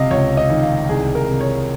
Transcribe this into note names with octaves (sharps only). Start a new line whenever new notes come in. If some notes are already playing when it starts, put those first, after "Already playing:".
Already playing: C#2 C3 D#5 F5
C#2 C#5
D#5
D#3
F5
C2 G#4
A#4
C3
C#5